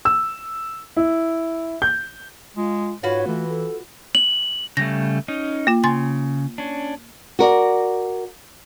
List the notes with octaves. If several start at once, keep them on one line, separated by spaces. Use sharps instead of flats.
E6
E4
G6
G#3 F4
G#2 F4 F#4 B4 C#5
E3 A3
A4
F#7
C#3 G3 A3 A#6
C#4 D#4
A#3 F4
C#3 G#5 C6 A6
C#4 D4
F#4 A#4 D5